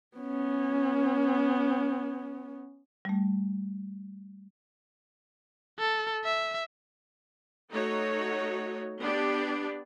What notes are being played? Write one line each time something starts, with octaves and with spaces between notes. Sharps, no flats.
B3 C#4
G3 A3
A4
E5
A3 D#4 F#4 C#5
B3 D4 G4 B4 D5